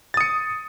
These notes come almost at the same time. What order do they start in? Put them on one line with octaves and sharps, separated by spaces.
A6 D#6 C#7